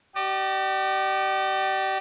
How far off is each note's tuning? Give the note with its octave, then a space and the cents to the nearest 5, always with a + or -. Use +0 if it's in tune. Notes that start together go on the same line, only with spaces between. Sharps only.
G4 -35 D5 +35